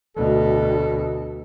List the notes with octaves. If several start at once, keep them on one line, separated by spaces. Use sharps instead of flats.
D2 B2 A4